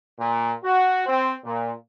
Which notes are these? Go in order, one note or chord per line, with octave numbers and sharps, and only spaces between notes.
A#2
F#4
C4
A#2